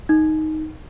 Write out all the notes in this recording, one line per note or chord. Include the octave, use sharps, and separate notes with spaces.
D#4